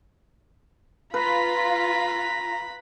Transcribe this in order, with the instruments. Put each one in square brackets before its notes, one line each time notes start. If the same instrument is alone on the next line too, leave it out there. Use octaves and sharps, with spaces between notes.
[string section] F4 [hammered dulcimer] B4 [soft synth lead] A#5 [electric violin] B5 B6